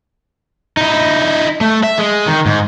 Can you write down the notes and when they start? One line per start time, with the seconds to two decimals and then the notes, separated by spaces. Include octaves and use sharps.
0.77 D#4 E4
1.61 A3
1.83 E5
1.99 G#3
2.27 D#3
2.46 G#2